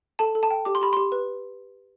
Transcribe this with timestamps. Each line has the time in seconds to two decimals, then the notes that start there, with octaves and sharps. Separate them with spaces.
0.19 A4 A5
0.35 A4
0.43 A5
0.51 G5
0.65 G4 D6
0.75 C6
0.82 G4 B5
0.93 G4 C6
1.12 B4